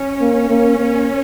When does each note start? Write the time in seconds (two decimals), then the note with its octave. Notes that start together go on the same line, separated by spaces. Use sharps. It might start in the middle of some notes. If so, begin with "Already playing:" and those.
Already playing: C#4
0.21 A#3
0.49 A#3
0.79 A#3